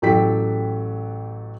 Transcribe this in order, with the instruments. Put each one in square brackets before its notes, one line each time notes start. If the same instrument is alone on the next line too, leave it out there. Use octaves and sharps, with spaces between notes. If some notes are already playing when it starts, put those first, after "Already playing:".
[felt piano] A1 F#3 G4 A4 G5 B6